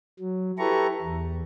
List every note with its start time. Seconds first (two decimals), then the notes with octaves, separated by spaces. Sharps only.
0.20 F#3
0.59 E4 G4 A4 B4 A#5 C#6
1.02 E2